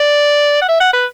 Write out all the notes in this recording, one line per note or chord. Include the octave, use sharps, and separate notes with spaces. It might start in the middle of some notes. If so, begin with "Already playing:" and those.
Already playing: D5
F#5
E5
F#5
B4